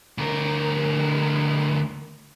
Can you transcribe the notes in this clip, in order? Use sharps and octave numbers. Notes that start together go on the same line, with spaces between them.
D2 A#4